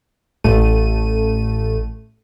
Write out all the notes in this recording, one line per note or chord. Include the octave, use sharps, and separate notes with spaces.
A1 A3 D#7